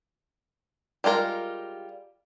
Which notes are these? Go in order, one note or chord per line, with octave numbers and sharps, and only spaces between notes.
G3 G#3 F4 A#4